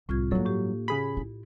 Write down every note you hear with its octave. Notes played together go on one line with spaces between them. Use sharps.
C2 A2 F4 G#6
G2 F#3 A#3 D4 A4
A2 G4
C#3 G#4 B5
E4